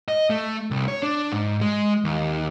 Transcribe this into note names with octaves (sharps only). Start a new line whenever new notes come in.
D#5
A3
C2
C#5
D4
G#2
G#3
D#2